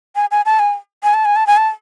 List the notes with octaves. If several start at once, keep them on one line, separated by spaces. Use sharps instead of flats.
G#5
G#5
A5
G#5
G#5
A5
G#5
A5
G#5
A5